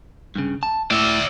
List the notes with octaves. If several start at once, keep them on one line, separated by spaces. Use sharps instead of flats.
G2 C#3
A5
A2 D5 E5